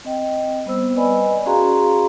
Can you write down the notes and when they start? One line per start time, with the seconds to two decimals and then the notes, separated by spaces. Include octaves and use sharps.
0.05 C4 D#5 G5
0.66 G3 B3 C5 E6
0.96 B4 D5 D#5 G#5 B5
1.46 C#4 F#4 G#4 F5 A#5 C6